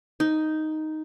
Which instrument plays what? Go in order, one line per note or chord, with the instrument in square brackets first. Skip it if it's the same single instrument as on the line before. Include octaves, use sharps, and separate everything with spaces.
[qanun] D#4